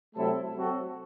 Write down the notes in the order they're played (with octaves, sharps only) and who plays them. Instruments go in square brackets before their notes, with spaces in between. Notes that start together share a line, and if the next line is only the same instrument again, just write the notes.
[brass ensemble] C3 F#3 A3 E4 A4
F#3 C4 F#4 A4